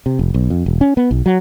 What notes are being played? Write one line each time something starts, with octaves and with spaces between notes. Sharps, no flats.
C3
F1
B1
F2
E1
C#4
B3
B1
F#3